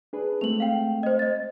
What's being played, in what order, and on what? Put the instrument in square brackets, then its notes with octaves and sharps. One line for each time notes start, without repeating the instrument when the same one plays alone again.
[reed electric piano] D4 G#4 B4
[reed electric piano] G#3 A3 C4 [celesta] F7 F#7
[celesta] F5 G5
C5 D#5
D#5 A6